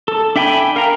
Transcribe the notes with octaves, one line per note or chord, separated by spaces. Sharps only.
A4
D4 E5 G5 G#5 B5
A#4 F5 G5 A#5